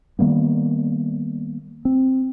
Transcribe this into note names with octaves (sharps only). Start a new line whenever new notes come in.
D#3 G3 A#3 B3
C4